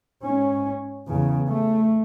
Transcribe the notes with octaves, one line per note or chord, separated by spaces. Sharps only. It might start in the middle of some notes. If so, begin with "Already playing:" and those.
G#2 C#4
E2 C#3
A3